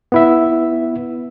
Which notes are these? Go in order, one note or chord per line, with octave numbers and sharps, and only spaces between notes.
B3 E4 E5